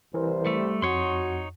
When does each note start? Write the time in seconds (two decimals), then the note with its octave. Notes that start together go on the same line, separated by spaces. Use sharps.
0.14 C2 E3 A#4 C5
0.46 G3 A3
0.82 F2 D#4 F#4 C#5 C6